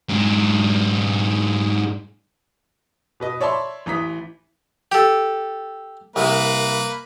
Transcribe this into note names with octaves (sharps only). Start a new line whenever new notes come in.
G#2 D4
B2 B4 D#5
C#5 D5 E5 A5 B5 C6
A1 E3 A#5 D#6 B6
G4 A4
C2 A#3 B4